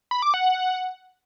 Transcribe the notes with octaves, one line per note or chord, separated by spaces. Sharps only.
B5
D6
F#5